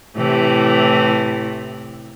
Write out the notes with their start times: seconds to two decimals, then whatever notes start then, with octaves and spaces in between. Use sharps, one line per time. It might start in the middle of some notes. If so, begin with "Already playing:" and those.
0.16 A2 C3 E3